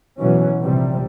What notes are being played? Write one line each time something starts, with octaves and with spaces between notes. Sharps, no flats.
B2 E3 F#3 C#4
A#1 C3 G3